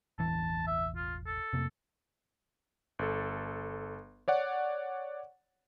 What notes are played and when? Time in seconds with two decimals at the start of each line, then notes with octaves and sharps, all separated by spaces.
0.19 E1 A1 E3 A5
0.67 E5
0.96 F4
1.26 A4
1.53 F2 C3 A#3
2.99 G1 A4
4.28 C#5 D5 F#5